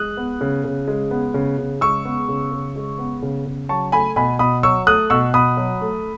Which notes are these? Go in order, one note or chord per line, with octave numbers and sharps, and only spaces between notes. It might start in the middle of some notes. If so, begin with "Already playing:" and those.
Already playing: G#3 D#6 F#6
B3
C#3
C#3
G#3
B3
C#3
C#3
G#3 C#6 E6
B3
C#3
C#3
G#3
B3
C#3
C#3
F#3 A5 C#6
A3 G#5 B5
B2 G#5 B5
B2 B5 D#6
F#3 C#6 E6
A3 D#6 F#6
B2 C#6 E6
B2 B5 D#6
F#3
A3